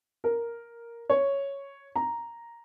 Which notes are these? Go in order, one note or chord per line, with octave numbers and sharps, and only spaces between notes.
A#4
C#5
A#5